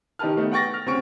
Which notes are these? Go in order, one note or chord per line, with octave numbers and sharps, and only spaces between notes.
D#3 D#4 G4 B4 A5 F6
D#3 A3 B3 D#4
F#5 G5 C#6 A6 A#6
F6
D2 C4 C#4 C#6 D7